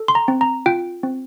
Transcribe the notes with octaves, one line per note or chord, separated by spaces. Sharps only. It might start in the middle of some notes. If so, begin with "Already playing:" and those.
Already playing: A4
C6
A#5
C4
A#5
F4 G5
C4